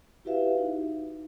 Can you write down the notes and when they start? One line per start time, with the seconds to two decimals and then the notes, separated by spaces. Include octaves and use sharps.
0.25 E4 F#4 G4 B4 E5 F5
0.59 D#4